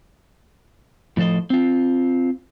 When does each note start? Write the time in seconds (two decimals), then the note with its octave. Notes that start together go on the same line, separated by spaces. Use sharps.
1.17 A2 F3 A4 C5 D#5
1.50 C4 F4